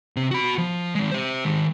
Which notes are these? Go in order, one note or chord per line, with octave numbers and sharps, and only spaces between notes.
C3 C4
F#4 B5
F3
D#3 G#3
G4 C5
D#3 G#3